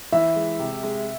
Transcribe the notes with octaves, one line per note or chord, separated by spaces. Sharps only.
E3 E5
G#3
C3
G#3